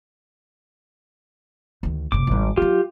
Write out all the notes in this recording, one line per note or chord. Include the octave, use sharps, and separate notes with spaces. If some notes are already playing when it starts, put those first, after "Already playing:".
D2 D#3
F#1 C3 D6
G#1 G3
F#3 B3 F4 G4